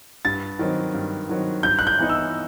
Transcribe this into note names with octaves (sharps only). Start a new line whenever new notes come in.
G2 A6
D#3 F#3 C4
G2
D#3 F#3 C4
G2 G6
F#6
G6
E3 B3 D#4
E6